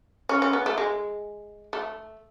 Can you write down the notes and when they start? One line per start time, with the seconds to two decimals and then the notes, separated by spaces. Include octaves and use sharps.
0.29 C#4
0.42 C#4
0.53 B3
0.66 A3
0.78 G#3
1.73 A3